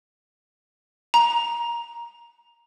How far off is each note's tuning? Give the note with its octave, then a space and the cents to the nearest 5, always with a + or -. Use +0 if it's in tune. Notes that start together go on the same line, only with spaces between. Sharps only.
A#5 +15